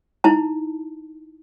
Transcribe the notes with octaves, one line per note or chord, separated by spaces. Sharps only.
D#4 E4 A5